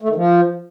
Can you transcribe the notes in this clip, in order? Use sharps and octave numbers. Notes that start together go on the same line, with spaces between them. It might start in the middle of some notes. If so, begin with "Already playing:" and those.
A3
D#3
F3